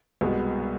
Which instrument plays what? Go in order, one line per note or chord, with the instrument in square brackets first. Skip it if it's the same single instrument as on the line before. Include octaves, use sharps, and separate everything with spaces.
[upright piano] C2 B2 G#3 B3